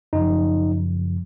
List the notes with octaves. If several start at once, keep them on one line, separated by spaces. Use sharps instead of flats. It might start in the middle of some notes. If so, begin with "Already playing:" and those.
F#2 C#3 F3 D#4